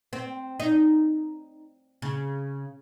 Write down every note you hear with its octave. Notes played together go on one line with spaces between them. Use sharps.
C4
D#4
C#3